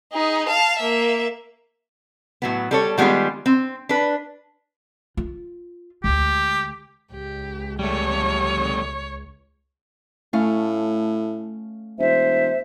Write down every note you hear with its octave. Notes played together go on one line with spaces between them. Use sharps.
D#4 G#4
F5 A5
A#3 E5
A2 F#3 B3
G3 A4 C#5
D#3 G3 G#3 B3 F4
C4
D4 B4
F4
D2 G#3 G4
C#2 G4
G3 A3 C#5
A2 A3 C#4 F5
E1 C5 E5